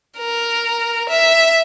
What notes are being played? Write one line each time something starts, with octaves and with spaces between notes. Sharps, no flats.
A#4
E5